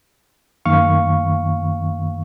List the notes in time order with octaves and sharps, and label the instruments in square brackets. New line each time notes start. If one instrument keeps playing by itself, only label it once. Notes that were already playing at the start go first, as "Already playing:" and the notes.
[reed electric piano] F#2 D#3 A#3 F5 C#6